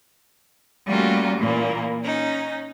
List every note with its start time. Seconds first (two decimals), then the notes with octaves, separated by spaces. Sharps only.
0.87 G3 A3 A#3 C#4 F4 F#4
1.39 A#2 E3 A#3
2.04 C#4 D#4